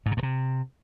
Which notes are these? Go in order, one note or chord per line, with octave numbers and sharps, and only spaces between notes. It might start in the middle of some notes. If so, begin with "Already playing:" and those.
G#2
C3
G2
C3